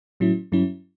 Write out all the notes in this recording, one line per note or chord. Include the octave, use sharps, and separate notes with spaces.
A2 F#3 C#4 E4
G2 F#3 C#4 E4